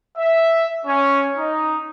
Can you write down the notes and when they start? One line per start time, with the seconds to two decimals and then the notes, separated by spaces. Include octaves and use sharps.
0.16 E5
0.85 C#4
1.37 D#4